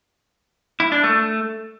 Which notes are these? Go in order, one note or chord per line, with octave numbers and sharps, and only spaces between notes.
E4
D4
A3